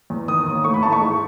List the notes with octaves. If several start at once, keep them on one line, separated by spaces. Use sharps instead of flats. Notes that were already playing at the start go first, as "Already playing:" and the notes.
E2
D#3 D#6
D#2
A2 C#6
B5
A1 A5
C#6
G#2